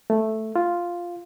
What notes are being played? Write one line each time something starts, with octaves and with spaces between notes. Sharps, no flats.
A3
F4